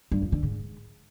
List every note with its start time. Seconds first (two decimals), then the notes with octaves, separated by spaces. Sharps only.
0.12 G2
0.22 F2
0.32 D3
0.43 G#2